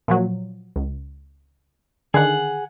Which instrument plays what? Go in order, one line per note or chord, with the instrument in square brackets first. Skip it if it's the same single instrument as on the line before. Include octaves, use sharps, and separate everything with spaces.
[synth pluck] A#2 F3 F#3
C#2
[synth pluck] D3 D#3 [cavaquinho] G#4 F#5